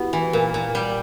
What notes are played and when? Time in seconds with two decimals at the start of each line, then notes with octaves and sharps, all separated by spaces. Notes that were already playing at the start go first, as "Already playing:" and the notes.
Already playing: B3 E4 F#4 G4
0.13 E3
0.33 A#2 A#4
0.54 A#2
0.75 G3